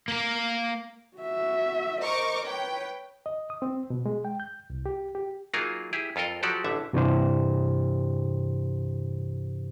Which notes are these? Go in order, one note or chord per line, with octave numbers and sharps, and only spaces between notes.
A#3 A#4
F#4 E5
A#4 C5 D#5 C#6 D6
B4 C#5 G5
D#5
D#6
C4
B2
G#3
G5
G6
C2
G4
G4
F#3 A#3 D#4 F4 G#4 A#4
E4 G4 G#4
F2 F4 A4 A#4 D#5
F3 F#3 F#4 G4 A4 D5
A1 D3 E5
G2 C3 E3 D4 G4 C5